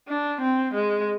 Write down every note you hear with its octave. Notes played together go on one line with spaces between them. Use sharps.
D4
C4
G#3